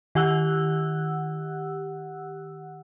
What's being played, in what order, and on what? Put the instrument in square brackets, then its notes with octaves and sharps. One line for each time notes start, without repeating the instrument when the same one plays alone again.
[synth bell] D#3 G4 F#5 E6 F#6